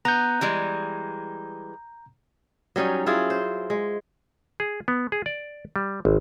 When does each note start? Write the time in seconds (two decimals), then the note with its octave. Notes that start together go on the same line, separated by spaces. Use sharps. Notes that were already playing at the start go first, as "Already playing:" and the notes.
0.05 B3 A#5 G6
0.41 E3 G3 G#3
2.76 F#3 G3 C#4 D#4
3.06 F#3 E4 F4 G#4
3.30 C5
3.70 G#3
4.60 G#4
4.88 B3
5.12 G#4
5.26 D5
5.76 G3
6.05 G#1